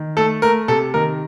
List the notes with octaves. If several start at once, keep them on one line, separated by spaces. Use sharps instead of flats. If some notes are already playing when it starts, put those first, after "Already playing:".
Already playing: D#3
A3 A4
A3 A#4
C3 A4
D#3 A#4